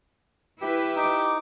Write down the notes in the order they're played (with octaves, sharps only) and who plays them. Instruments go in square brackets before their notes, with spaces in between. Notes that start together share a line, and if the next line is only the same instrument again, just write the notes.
[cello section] E4 B4 [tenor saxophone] G4
[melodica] D#4 [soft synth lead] D6